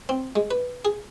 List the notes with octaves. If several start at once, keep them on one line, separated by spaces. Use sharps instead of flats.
C4
G#3
B4
G#4